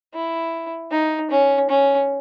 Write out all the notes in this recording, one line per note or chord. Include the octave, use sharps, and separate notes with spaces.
E4
D#4
C#4
C#4